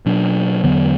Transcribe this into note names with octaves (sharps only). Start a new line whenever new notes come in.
B2 F#3 D4
E2 D3 F#3 B3